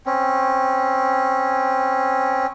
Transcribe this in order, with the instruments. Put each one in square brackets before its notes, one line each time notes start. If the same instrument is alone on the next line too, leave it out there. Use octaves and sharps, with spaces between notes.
[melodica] C4 C#4